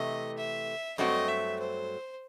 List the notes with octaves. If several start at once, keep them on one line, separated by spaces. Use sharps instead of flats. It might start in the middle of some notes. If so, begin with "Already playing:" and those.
Already playing: C3 E3 A3 D#5
E5
G2 F#3 A3 C4 F#4 D#5
E5
C5